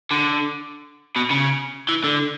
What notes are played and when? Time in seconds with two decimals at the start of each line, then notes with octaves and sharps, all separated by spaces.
0.12 D3
1.16 B2
1.30 C#3
1.88 E3
2.04 D3